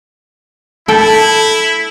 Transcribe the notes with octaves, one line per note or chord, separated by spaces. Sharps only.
E4 A4 G5